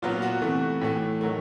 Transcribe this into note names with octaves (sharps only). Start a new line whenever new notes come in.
A#2 F#3 B3 F4
F#4
C3 E3 A3
A2 E3 A3
D#3 F#3 A3